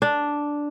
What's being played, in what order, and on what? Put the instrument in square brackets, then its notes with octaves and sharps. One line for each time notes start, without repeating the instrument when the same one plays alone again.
[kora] D4